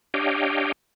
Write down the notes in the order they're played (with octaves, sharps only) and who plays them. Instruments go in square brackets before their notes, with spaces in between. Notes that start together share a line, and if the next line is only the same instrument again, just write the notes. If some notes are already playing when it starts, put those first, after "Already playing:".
[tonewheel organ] D4 G4 C#5 D#5 F5 G5